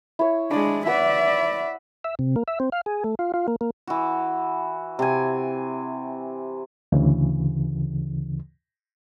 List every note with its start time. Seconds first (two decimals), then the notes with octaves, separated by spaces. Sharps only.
0.19 E4 C#5
0.51 G#3 D4 B5 D#6
0.86 B4 D5 E5 F#5 B5
2.04 E5
2.19 C3
2.36 A#3
2.48 E5
2.60 C4
2.72 F5
2.86 G#4
3.04 A3
3.19 F4
3.34 F4
3.48 A#3
3.61 A#3
3.87 E3 F#4
4.99 C3 G#5
6.92 D2 C#3 E3